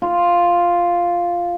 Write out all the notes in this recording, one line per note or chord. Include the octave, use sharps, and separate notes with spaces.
F4